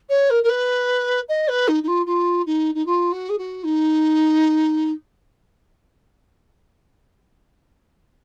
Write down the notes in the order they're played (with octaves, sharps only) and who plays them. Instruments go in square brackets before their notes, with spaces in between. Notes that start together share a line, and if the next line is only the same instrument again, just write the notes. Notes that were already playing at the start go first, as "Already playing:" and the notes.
[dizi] C#5
A#4
A#4
B4
D#5
B4
D#4
D#4
F4
F4
D#4
D#4
F4
F#4
G#4
F#4
D#4